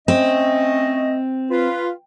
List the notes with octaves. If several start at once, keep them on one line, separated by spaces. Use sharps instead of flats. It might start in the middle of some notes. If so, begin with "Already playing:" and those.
A3 C4 C#4 D#5
F4 B4